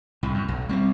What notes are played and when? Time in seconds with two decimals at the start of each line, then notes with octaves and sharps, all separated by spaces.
0.23 C2 A2
0.34 F#2
0.48 B1
0.69 G3 B3 C4